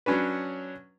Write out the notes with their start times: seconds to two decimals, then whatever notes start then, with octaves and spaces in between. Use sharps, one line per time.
0.06 F#3 C#4 D4 B4